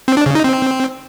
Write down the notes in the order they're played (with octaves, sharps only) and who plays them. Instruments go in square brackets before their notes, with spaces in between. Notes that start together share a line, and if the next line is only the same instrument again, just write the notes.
[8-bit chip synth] C4
D4
C#3
D#4
C4